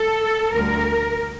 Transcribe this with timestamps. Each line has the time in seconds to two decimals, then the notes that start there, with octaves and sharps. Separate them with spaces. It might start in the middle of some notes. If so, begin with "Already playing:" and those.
Already playing: A4
0.52 D2 D3 G3 A#4